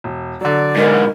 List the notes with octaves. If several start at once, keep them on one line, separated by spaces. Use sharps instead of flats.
E1
D3 F#3 D5
G#2 B2 A#4